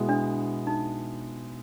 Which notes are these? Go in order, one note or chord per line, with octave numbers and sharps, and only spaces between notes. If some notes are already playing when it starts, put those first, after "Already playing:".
Already playing: B2 G#3 B3 E4
D4
D#4